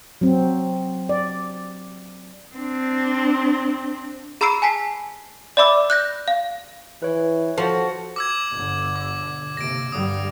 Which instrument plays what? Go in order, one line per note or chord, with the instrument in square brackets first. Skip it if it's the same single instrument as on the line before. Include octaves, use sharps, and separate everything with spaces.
[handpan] F#3 C4
D5
[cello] C4 D4
[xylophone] G#4 A#5 B5 E6 C7 D7
G#5 A5 B6 C7
D5 E5 B5 D6 E6
F#6 G6 A#6
F5
[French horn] E3 [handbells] B4 C#5
[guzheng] F3 [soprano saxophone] F#4 [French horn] A4 [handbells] C5 A5
[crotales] D6 E6 G#6
[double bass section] G1 B2 D3
[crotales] D6
[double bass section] D#2 C3 [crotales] A#6 D7
[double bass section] G2 D3 G3 [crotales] D#6